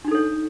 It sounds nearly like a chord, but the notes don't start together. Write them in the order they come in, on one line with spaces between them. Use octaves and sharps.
D4 D#4 A4 C#5